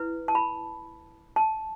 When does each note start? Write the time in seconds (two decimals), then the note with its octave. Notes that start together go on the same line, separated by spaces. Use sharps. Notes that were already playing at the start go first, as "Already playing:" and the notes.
Already playing: E4 B4
0.28 A5
0.35 B5
1.36 A5